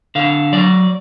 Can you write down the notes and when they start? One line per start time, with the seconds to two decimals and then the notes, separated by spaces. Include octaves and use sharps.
0.15 D3 F5
0.53 F#3 D5